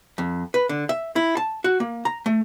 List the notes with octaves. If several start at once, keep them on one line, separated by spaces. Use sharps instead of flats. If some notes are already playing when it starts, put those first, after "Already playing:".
F2
B4
D3
E5
E4
A5
F#4
A#3
A#5
A3